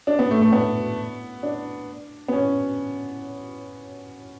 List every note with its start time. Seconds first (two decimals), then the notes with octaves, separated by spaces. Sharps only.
0.07 D4
0.19 B3
0.31 A3
0.42 A3
0.52 B3
1.43 D4
2.28 B3
2.33 C#4